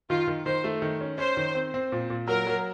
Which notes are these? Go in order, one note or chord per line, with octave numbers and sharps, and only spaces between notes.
D#3 F4
D#3
D#3 C5
A3
D#3
C#4
C#4 C5
D#3
C4
C4
A#2
A#2
F#3 A#4
F#3